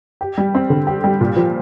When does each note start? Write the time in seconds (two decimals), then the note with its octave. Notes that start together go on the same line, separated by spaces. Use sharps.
0.21 G4
0.38 G3
0.55 C4
0.70 D3
0.87 G4
1.04 G3
1.21 A#2
1.36 F3